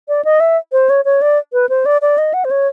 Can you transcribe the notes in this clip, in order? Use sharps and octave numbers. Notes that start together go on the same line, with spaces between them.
D5
D#5
E5
C5
C#5
C#5
D5
B4
C5
D5
D5
D#5
F#5
C5
C#5